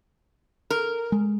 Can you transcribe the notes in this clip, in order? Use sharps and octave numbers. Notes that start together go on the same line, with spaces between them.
A#4
G#3